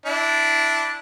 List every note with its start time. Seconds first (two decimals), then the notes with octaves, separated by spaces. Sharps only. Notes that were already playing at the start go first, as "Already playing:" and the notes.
0.06 D4 E4